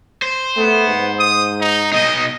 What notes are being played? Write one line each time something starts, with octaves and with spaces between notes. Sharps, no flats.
C5
A3 B3
G#2
D#6
D#4
B2 D#4 D#5